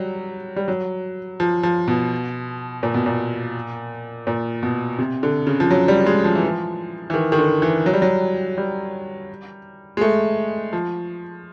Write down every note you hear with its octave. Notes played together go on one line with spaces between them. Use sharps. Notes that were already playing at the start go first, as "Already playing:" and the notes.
Already playing: F#3 G3
G3
F#3
F3
F3
B2
A#2
B2
A#2
A#2
B2
C3
D3
C#3
F3
F#3
G3
G#3
F3
E3
F3
E3
D#3
D#3
D3
E3
F#3
G3
F#3
G3
G#3
A3
F3